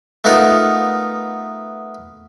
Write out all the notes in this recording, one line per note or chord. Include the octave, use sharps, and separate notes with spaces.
A3 B3 D#4 F4 A#4 F#5